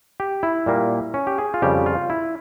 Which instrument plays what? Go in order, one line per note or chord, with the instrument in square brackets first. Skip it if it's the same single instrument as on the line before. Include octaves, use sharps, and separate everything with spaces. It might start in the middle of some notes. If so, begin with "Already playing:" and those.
[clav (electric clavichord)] G4
E4
A#2 G3 A#3
C#4
G4
G#4
F4
F2 C#3 G3 G4
F4
E4